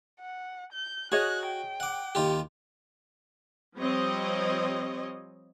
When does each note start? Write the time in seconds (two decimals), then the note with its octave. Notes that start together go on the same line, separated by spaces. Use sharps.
0.20 F#5
0.73 G6
1.12 F#4 G#4 C#5 D#5 F#6
1.47 G5
1.80 F#5 D6
2.15 D#2 F4 G4
3.77 F3 G3 C4 C#5 D#5